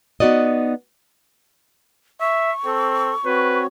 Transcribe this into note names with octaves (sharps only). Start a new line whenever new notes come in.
B3 D#4 F#4 D5 D#5
E5 C#6
C4 A4
C4 F#4 B4 C#5